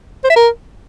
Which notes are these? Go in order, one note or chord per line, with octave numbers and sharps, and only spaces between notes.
C5
E5
A#4